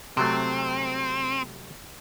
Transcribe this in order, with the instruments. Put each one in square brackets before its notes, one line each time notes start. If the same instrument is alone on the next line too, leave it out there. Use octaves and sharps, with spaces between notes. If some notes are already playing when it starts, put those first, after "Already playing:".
[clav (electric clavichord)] C3 F#3 A3 [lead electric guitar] C4